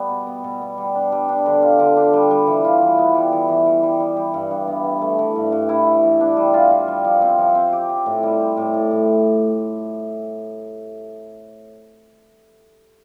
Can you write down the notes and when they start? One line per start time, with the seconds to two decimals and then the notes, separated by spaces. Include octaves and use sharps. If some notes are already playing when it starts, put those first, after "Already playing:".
Already playing: G3 B3
0.10 B2
0.27 B3
0.44 B2
0.61 B3
0.78 G3
0.95 D4
1.12 G3
1.29 D4
1.46 D3
1.62 F4
1.79 D3
1.97 D4
2.13 G3
2.31 G3
2.47 E3
2.64 F4
2.82 E3
2.98 B3
3.15 G3
3.32 E3
3.49 E3
3.66 E3
3.83 G3
4.00 G3
4.17 G3
4.34 G2
4.51 G2
4.68 B3
4.84 B3
5.02 A3
5.19 E3
5.36 G2
5.52 G2
5.69 E4
5.86 E4
6.03 E3
6.20 D4
6.37 G3
6.54 F4
6.71 F4
6.88 G3
7.04 F3
7.22 C4
7.38 F3
7.55 C4
7.73 G4
7.89 G4
8.06 A2
8.23 G3
8.40 G3
8.57 A2
8.74 A2
8.91 A2